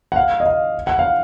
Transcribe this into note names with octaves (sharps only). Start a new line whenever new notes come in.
F#5
F5
D#5
F5
F#5
F5